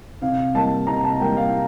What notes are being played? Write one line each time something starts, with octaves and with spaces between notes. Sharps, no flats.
C3 F5
G3 A#3 A5
C3 A#5
A5
G3 A#3 G5
F5